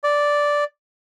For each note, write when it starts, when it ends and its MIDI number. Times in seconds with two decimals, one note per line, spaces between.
0.04 0.64 74